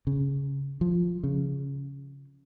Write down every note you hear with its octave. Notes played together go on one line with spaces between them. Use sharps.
C#3
F3
C#3